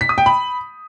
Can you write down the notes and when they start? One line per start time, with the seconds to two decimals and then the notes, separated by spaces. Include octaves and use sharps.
0.01 B6
0.09 D#6
0.18 G5
0.26 B5